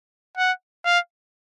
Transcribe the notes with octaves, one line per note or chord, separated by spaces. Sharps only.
F#5
F5